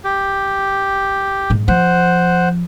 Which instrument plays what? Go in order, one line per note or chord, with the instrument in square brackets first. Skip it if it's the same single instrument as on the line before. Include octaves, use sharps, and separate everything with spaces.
[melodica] G4
[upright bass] G#2 G#3
[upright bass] F3 [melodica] C5 F#5